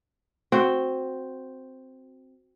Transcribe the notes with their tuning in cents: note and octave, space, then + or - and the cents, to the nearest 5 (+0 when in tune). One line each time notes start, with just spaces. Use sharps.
C4 +0 F#4 -5